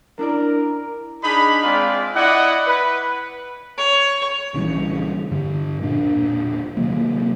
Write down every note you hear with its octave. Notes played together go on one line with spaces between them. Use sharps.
D4 E4 A#4 D5
D4 D#4 G#4 B5
G#3 C4 D4 F4 D5
E4 D5 D#5 F#5
B4
C#5
A#1 C#3 E3 G3
G2 D3
E1 A#2 D4
C3 D#3 F#3 A#3